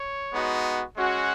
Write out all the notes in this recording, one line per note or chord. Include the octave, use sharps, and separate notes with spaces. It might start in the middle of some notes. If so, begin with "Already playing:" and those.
Already playing: C#5
G#3 B3 D#4 F#4
G#3 C#4 F#4